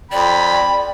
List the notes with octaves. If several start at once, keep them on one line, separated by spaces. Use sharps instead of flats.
F2 D5 G5 B5